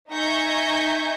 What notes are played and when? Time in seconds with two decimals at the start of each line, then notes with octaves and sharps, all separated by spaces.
0.10 D#4 E5 G#5 C#6 G6 A#6